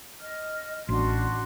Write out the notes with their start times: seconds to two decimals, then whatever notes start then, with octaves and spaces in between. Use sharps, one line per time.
0.20 D#5 F6
0.89 A1 D4 F#4 C6